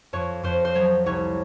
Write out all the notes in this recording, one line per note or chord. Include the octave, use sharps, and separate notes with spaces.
F2 C#5
F2 C5
C5
F#3 C#5
C2 C#5